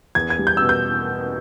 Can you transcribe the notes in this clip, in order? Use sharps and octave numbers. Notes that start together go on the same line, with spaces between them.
E2 G#6
G#6
G3
G6
B2 E6
G6